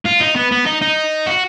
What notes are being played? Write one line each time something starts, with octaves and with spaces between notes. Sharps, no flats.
F4
D#4
B3
B3
D#4
D#4
F#4